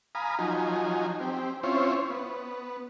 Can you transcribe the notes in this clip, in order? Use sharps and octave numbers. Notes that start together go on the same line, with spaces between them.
F5 G#5 A#5 B5 D#6
F3 F#3 D#4 G#5
C4 G4
C4 C#4 E4 F4 C5 C#5
B3